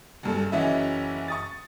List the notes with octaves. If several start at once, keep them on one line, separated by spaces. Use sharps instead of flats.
F#1 G2 A4
F#1 E3 C#4 F#4 D#5 E5
C#6 D#6 A6